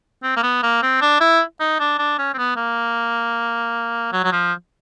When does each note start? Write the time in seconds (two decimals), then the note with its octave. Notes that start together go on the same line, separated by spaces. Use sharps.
0.23 C4
0.36 A#3
0.43 B3
0.63 A#3
0.82 C4
1.01 D4
1.21 E4
1.60 D#4
1.80 D4
1.98 D4
2.18 C#4
2.34 C4
2.37 B3
2.56 A#3
4.12 F#3
4.24 F#3
4.32 F3